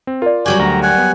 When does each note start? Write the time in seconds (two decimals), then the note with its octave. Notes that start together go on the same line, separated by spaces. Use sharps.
0.07 C4
0.22 F4 A#4 D5
0.46 F#3 G3 F#4 G4 G#5
0.59 D2 A#5
0.83 F#5 G#5
0.98 B3